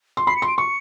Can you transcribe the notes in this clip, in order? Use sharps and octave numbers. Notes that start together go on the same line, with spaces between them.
C6
B5 C7
C#7
C6
D7
C#6 C#7